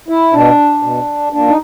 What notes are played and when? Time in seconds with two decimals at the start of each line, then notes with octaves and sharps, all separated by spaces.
0.08 E4
0.33 B2 D4
0.82 B2
1.32 A#2 D4
1.48 D#4